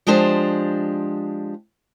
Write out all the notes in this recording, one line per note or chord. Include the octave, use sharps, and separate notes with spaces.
F3 G#3 D4 G4 C5